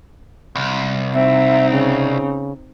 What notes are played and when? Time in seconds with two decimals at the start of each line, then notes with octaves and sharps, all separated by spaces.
0.56 C2
1.14 C4 D#4 E5
1.71 C#3